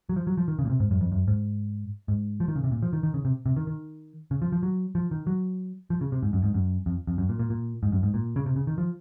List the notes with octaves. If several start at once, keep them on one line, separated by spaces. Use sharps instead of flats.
F#3
F3
F#3
F3
D#3
C#3
A#2
C3
G#2
F#2
F2
F#2
G#2
G#2
F3
D#3
C#3
C3
A#2
F3
D#3
D#3
C#3
C3
C3
D#3
D#3
C#3
F3
F3
F#3
F3
D#3
F#3
F3
C#3
C3
G#2
F#2
G#2
F#2
F2
F2
F#2
A#2
A#2
A#2
G#2
F#2
G#2
A#2
C#3
C3
C#3
D#3
F3